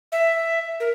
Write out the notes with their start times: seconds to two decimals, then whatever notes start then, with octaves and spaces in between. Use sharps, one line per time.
0.12 E5
0.80 A#4